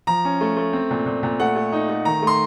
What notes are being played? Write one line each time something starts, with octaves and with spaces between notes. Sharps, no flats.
F3 A#5
C#4
A3
A3
C4
A#2
A#2
A#2
A3 F#5
A3
D#4
A3
D#3 A#5
A3
C6